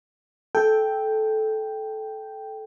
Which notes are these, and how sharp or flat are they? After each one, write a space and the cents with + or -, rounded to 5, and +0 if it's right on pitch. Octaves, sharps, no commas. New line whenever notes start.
A4 -15 G5 +0